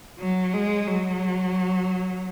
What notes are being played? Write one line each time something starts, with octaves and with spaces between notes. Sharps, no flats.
F#3
G#3
F#3